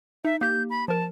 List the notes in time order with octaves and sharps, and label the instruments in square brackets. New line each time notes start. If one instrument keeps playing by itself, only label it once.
[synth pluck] D#4 [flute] E5
[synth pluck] A#3 G4 [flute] G6
[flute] B5
[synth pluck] F3 A#4 [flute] A5